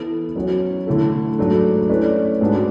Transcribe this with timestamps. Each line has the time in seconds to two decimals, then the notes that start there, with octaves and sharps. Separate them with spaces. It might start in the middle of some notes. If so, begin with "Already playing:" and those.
Already playing: E3 B3 E4 A4
0.36 F#3 C#4 F#4
0.87 D3 A3 E4 A4
1.38 G#2 F#3 A3 D4 A4
1.89 A3 C#4 E4 B4 D5
2.41 G#2 G#3 D4 F#4 B4